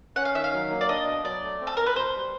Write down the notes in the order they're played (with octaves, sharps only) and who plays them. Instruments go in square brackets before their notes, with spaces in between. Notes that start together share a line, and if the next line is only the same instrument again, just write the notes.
[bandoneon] C#4 [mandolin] F#5
[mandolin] F5
[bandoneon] D#3 [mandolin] E5
[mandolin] F5
[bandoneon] F#3
A#3
[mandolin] D5
[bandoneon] D4 [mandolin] D#5
[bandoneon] B2
[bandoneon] F#3 [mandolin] D5
[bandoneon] A3
C4
[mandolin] A4
[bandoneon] E2 [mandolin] A#4
[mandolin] B4
[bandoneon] B2 [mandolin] C5
[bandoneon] G3